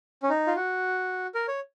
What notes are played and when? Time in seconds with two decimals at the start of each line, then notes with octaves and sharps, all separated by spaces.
0.23 C#4
0.30 D#4
0.47 F4
0.56 F#4
1.35 A#4
1.48 C#5